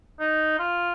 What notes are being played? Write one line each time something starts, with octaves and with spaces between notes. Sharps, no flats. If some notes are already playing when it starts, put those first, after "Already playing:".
D#4
F4